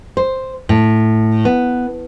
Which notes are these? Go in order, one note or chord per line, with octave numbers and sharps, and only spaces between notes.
C5
A2
B3